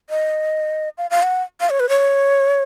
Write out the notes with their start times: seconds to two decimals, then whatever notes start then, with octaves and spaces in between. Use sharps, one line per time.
0.10 D#5
0.98 F5
1.11 F5
1.23 F#5
1.61 F5
1.70 C#5
1.80 B4
1.89 C#5